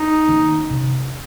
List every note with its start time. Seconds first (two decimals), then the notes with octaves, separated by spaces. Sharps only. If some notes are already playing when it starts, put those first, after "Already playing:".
Already playing: D#4
0.27 D#3 A#3 C#4
0.71 C3